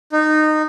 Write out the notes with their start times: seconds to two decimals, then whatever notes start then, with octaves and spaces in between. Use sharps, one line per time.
0.12 D#4